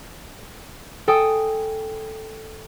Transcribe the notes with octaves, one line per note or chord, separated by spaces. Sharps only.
A4 G5 G#5 D#6